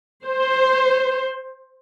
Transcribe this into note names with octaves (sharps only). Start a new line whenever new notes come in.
C5